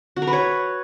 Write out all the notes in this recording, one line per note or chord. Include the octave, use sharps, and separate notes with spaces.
F#4
A#4
B4
C#5